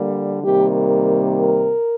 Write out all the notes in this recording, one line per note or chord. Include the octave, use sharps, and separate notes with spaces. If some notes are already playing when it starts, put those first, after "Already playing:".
Already playing: D3 G3 A#3
C3 D#3 G3 A#3 G4
A#4
A#4